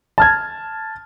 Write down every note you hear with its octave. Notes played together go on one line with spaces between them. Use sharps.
A5 F6 G#6